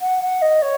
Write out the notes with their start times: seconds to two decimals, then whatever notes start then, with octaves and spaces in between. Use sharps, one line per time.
0.01 F#5
0.22 F#5
0.41 D#5
0.62 C#5